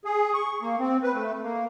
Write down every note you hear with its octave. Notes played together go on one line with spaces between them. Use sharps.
G#4
C#6
A#3
C4
B4
A3
A#3